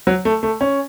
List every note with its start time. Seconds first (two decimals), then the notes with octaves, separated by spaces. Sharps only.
0.07 F#3
0.25 A3
0.43 A3
0.61 C#4